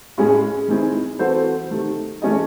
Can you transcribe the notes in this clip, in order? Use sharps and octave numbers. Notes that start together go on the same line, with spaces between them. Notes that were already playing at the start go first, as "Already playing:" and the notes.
A2 G#3 C#4 G#4
D#3 G#3 C4 E4 G#4
E3 C4 F#4 A4 C5
C3 D#3 A3
E3 A3 C#4 G#4 D#5